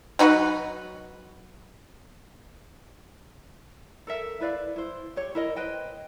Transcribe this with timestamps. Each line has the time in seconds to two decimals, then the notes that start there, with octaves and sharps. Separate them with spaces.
0.19 F#3 D#4 F#4 B4
4.07 A4 A#4 E5
4.40 E4 B4 D5 F5
4.76 E4 C5
5.16 G4 C#5
5.35 E4 A#4 D#5
5.56 B4 C5 D#5 G5